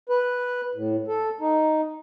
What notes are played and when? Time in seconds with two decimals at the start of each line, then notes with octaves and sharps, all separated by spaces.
0.09 B4
0.75 A2
1.08 A4
1.41 D#4